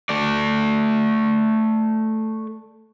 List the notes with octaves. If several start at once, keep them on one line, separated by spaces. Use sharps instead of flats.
A3 D5